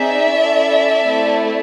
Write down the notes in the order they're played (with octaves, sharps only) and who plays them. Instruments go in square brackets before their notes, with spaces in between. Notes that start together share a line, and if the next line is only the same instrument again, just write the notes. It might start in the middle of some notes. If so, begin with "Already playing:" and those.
Already playing: [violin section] C4 D#4 G#4 D5 E5
C#4 E4 A4
A3 C4 E4 A4